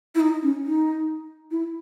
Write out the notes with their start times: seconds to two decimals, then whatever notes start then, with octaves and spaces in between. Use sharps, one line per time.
0.15 E4
0.21 D#4
0.43 C#4
0.64 D#4
1.51 E4